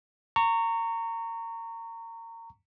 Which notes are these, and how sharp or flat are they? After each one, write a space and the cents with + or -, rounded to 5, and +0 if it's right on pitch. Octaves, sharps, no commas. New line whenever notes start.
A#5 -25 C#6 +5